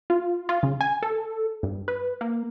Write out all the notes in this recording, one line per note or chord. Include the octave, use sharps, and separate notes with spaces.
F4
F4
C#3
G#5
A4
G2
B4
A#3